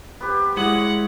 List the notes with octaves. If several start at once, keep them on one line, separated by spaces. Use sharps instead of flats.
B3 C4 G4
G#3 E4 C#5 F#5 D#6 F#7